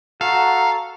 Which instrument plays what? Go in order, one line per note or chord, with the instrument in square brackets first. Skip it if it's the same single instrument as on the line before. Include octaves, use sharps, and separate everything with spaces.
[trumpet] F#4 [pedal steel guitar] A4 [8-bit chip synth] F5 [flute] A#5